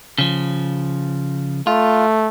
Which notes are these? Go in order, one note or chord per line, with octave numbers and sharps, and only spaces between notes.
C#3 F3
A3 F4